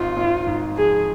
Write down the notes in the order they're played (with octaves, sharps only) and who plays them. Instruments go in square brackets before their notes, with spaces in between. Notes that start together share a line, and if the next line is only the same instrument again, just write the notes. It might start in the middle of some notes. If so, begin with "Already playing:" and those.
Already playing: [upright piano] G#1 [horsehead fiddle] F4
[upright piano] G#1
G#2
[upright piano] F3 [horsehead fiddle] G#4